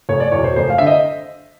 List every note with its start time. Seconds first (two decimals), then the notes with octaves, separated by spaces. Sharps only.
0.09 F1 C#5
0.20 D5
0.32 E2 B2 C#5
0.44 C5
0.56 F1 C5
0.70 F5
0.78 D3 E5
0.87 D#5